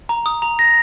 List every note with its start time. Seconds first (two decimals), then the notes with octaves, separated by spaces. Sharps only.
0.09 A#5
0.26 D#6
0.42 A#5
0.59 A#6